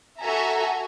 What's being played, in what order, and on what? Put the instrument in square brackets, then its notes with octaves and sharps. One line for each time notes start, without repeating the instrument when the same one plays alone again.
[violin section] F#4 A4 E5 G#5 A#5